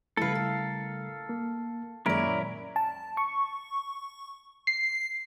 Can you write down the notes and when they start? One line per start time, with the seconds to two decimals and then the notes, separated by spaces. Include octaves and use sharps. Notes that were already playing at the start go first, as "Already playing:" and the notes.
0.17 C#3 G3 A3 E4 A4 B4 F5
0.35 A#4
1.29 A#3
2.06 F#2 D#3 G#3 A#3 C#4 E4 A#4 D5
2.26 A#2
2.76 A5
3.17 C#6
4.67 C7